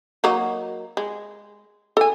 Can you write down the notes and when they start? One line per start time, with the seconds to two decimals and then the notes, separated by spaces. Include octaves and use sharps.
0.24 F#3 A#3 D#4
0.97 G#3
1.97 A4 G#5